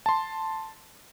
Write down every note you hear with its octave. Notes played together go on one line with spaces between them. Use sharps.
A5 C6